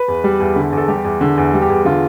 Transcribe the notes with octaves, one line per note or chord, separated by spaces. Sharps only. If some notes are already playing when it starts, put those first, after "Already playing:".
Already playing: B4
E2
G3
E2
D3
E2 A4
G3 G4
E2
D3
E2
G3
G4
E2
D3 F4